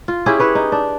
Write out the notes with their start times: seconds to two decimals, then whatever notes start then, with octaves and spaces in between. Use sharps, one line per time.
0.08 F4
0.26 C#4 E4 G4 G#4
0.39 E4 B4 C#5
0.55 D#4
0.72 D4